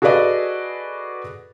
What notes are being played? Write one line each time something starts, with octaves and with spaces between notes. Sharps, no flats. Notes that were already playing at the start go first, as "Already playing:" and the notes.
F#4 G#4 A4 B4 D5 D#5